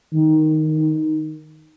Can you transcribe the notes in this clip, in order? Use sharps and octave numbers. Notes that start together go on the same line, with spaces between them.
D#3